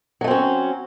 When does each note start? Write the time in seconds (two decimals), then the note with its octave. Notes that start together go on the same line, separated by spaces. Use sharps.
0.21 F#3
0.24 A3
0.28 C4
0.31 C#4